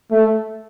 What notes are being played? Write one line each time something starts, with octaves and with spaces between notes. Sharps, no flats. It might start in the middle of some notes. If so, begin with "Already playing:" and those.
A3